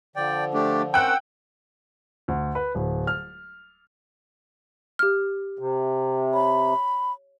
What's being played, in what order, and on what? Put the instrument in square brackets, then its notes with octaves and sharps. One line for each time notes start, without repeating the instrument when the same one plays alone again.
[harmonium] D3 F3 [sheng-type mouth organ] D5 G5
[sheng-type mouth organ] A3 D4 G4
[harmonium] C4 C#4 A#4 [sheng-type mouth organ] F#5 E6 [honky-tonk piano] G5 F#6
[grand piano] D2
B4
D1
F6
[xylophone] G4 F6
[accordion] C3
[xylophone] C#5 [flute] B5